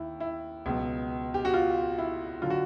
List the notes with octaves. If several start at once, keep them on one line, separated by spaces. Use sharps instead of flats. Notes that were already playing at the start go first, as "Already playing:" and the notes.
Already playing: D#2 E4
E4
C#2 B2 F#3
G4
F#4
F4
E4
D3 F#3 F4
F#4